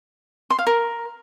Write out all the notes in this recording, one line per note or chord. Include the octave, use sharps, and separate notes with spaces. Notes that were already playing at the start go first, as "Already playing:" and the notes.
C6
F5
A#4